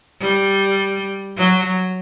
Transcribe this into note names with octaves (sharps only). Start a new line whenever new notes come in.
G3
F#3